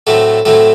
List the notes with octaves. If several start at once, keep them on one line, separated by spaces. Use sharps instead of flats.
A2 F#3 A3 C4 A4
A2 F#3 A3 C4 A4